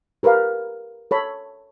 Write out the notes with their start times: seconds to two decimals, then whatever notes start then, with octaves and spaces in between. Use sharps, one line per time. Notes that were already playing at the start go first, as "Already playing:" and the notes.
0.23 G4 A#4 B4 D5 F5
1.11 A4 C#5 B5